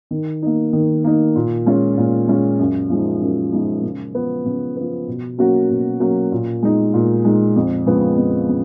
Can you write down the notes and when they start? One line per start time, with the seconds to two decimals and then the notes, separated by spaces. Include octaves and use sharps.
0.11 D#3
0.42 A#3 D#4
0.73 D#3
1.04 A#3 D#4
1.36 A#2
1.66 G#3 C#4 F4
1.98 A#2
2.28 G#3 C#4 F4
2.59 F#2
2.90 F3 G#3 D#4
3.22 F#2
3.52 F3 G#3 D#4
3.83 C#3
4.15 F3 B3
4.45 C#3
4.77 F3 B3
5.07 B2
5.38 F#3 A#3 C#4 F#4
5.70 B2
6.00 F#3 A#3 C#4 F#4
6.32 A#2
6.63 G#3 D#4
6.94 A#2
7.25 G#3 D#4
7.56 F2
7.86 C#3 F3 G#3 B3
8.18 F2
8.49 C#3